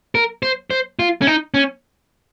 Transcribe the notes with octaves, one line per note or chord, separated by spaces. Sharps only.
A#4
C5
C5
F4
C#4
D#4
C#4